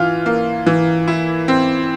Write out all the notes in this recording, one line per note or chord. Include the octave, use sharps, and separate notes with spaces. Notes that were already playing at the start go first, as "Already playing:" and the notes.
Already playing: E3 F4 F6
A#3
E3
E4
C4